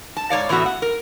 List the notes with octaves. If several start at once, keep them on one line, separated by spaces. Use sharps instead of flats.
A5
G#2 C#5 D5 F5
A2 E3 B3 F#4 E5
F#5
A#4